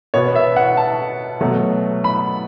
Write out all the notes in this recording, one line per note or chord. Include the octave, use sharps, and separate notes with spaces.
B2 B3 C#5
E5
F#5
A5
B2 F#3 A3
B5